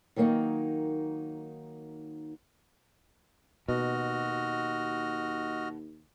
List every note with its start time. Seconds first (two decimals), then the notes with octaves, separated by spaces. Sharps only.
0.16 D#3 F#3 A#3 C#4 D#4
3.68 D#2 B2 F#4 D#5 F6